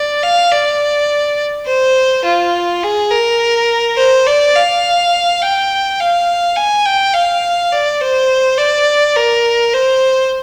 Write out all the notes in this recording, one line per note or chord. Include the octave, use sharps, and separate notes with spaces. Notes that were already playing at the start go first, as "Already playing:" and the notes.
Already playing: D5
F5
D5
C5
F4
G#4
A#4
C5
D5
F5
G5
F5
G#5
G5
F5
D5
C5
D5
A#4
C5